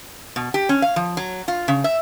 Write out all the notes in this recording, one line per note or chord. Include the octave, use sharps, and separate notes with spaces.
B2
G4
C#4
F5
F3
F#3
F4
C#3
E5